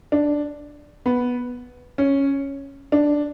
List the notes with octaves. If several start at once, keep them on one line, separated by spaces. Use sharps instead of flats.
D4
B3
C#4
D4